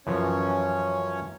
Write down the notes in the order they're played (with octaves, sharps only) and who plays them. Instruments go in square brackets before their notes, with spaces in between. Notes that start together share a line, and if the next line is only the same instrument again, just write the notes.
[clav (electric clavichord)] F#2 E3 F3 [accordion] C#4 C#5